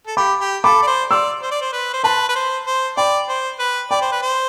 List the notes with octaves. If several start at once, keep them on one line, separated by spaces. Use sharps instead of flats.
A4
G4 B5 D6
G4
A4 B5 D6
D5
C5
D5 C6 E6
C5
D5
C5
B4
C5
B4 A5 C6
B4
C5
C5
D5 G5 B5
C5
B4
D5 G5 B5
C5
B4
C5